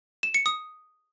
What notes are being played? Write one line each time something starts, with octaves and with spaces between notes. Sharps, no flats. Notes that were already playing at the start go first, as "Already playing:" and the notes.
E7
C#7
D#6